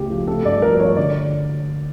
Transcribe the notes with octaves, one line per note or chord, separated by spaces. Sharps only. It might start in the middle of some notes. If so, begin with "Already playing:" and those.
Already playing: C#2 C#3 A3 G4
F3
A3 A4
G2 D5
F3 A#4
F3 C#5
D3 D5